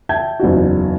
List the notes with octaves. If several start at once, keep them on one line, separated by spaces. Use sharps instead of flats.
E5 G5 A5 G6 G#6
F#1 E2 D#4 F#4